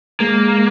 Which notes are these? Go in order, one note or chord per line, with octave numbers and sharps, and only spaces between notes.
G#3 A#3